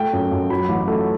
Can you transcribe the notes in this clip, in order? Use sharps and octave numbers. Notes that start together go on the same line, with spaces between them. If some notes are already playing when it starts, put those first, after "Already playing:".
Already playing: A3 G5
F#2
F#2
F#3 B5
A1
A3